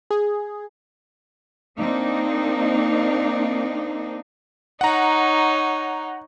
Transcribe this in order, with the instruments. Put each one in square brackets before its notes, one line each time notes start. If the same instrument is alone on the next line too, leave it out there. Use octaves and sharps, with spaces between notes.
[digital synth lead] G#4
[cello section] A#3 C4 D4 D#4
[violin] D#4 C#5 [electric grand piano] F#5 A#5